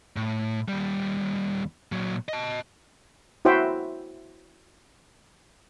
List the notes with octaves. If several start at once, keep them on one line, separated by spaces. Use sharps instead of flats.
A2
D#2 G3
A#2 F#3
D#5 A5
E4 F#4 C5 E5 G5